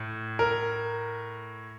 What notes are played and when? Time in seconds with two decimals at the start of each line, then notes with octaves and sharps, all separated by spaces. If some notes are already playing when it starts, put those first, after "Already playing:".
Already playing: A2
0.39 A#4